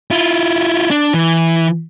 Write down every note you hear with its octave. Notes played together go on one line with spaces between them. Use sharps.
E4 F4
D4
E3